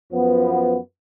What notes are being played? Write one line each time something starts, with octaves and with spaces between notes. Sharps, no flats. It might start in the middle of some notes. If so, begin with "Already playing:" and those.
F#2 F3 B3